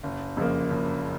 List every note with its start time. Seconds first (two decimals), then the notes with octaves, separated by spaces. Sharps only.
0.03 F#1
0.37 F2 C#3 F3 A#3
0.70 F#1